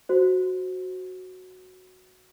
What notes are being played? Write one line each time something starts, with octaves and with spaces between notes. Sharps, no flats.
F#4 C5